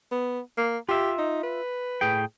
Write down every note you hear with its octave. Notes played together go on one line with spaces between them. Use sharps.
B3
A#3
F4 G4 E5
D#4
B4
A2 G#4 G5